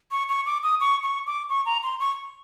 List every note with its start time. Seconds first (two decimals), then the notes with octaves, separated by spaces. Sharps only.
0.11 C#6
0.29 C#6
0.46 D6
0.63 D#6
0.80 C#6
1.03 C#6
1.27 D6
1.49 C#6
1.66 A#5
1.83 C6
2.00 C#6